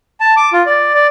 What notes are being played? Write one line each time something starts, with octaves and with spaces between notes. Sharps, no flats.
A5
D6
F4
D5
D5